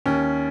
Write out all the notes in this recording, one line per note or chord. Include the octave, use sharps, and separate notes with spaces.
D#2 C#4